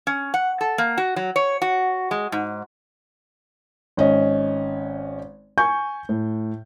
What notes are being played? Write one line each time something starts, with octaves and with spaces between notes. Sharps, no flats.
C#4
F#5
A4
A#3
F#4
F#3
C#5
F#4
G#3
G#2
G#1 C#4 D#5
G#5 C#6 G6
A2